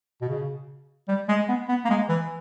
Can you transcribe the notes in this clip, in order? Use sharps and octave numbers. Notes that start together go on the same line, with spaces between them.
B2
C#3
G3
G#3
B3
B3
A#3
G#3
E3